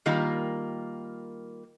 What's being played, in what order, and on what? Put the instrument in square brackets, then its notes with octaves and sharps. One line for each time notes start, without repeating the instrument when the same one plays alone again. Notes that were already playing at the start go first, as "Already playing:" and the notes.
[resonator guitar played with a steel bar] D#3 G3 A#3 F4 A#4